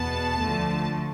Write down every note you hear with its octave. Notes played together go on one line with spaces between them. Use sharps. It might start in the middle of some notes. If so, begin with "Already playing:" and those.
Already playing: E2 B2 B3 A5
D2 D3 F3 A3